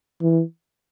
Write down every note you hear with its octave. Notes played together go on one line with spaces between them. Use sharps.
E3